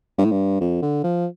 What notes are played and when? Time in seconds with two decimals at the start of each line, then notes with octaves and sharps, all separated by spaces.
0.18 G2
0.25 A2
0.32 G2
0.61 F2
0.82 D3
1.04 F3